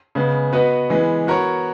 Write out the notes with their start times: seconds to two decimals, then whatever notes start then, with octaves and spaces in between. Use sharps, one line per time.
0.15 C#3 G#3 B3
0.53 B3 F#4 B4 D#5
0.90 E3 G#3 B3
1.27 B3 F#4 A#4 C#5